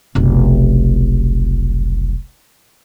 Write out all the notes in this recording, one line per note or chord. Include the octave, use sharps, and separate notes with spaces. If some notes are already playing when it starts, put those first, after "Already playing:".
F1 B1